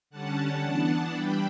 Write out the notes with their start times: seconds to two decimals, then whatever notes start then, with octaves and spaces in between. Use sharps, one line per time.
0.10 D3 G3 C#4 F#5 A5
0.62 E3 B3 D4
1.13 E3 G3 D4 G5 B5